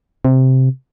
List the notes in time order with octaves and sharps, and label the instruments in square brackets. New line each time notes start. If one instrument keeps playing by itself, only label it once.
[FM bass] C3